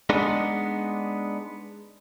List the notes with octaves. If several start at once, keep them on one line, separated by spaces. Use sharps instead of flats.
G#3 B3 D4 D#4